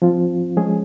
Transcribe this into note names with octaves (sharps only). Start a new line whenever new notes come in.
F3 C4 F4
F3 G#3 C#4 G#4